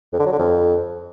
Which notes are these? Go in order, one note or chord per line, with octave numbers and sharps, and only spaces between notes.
F2
D3
F#3
D3
F2